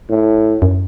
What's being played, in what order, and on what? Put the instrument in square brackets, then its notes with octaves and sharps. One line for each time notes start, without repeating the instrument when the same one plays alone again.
[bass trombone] A2
[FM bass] F#2